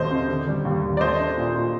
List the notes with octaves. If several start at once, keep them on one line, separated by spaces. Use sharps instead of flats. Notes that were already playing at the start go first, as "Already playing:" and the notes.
Already playing: D#2 D3 A3 C5 D#5
C4
D3
G3
D#2
D#2
D5
A3 C5 D#5
D4
A#2
A#2